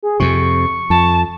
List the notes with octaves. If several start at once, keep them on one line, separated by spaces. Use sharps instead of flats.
G#4
F2 C3 C#6
F2 A5